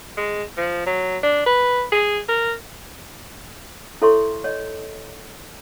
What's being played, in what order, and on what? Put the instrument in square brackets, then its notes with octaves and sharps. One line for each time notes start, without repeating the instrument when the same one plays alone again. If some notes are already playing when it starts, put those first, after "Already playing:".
[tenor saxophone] G#3
F3
F#3
D4
B4
G#4
A#4
[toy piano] E4 A4 C#5 E5 C6 C#6
C#5 D#5